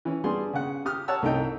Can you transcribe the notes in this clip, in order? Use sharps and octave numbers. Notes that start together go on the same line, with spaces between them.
E3 C#4
G3 B3 D4 G#4 C6
C#3 F#5
G4 D#6 F6
C#5 F#5 A5 E6
C2 A3 D#4 G5